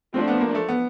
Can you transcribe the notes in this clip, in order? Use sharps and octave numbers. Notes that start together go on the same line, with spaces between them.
F3 A3 C4 D4
B3
A#3
A3
B3